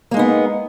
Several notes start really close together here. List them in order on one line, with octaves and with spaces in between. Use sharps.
A#3 G#3 D#4 B3